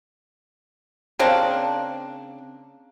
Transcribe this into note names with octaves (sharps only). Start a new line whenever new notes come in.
C#3 A#3 C4 D4